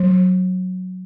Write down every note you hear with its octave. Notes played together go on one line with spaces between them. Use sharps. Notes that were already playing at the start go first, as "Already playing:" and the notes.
Already playing: F#3